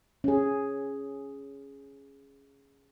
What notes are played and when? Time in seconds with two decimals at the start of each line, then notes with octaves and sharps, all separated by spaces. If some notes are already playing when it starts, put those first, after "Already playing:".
0.24 C#4 G#4